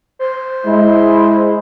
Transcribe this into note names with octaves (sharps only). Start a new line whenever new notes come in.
C5
G#3 E4